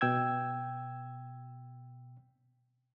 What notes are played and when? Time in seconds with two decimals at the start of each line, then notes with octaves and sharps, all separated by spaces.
0.01 B2 G5 E6 G#6